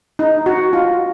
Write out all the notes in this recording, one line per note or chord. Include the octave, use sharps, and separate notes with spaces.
D#4
F#4
F4